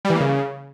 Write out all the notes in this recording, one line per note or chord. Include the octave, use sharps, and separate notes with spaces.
G3
E3
A#3
C#3